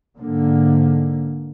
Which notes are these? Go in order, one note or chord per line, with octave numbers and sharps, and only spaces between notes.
G#2 D3 A#3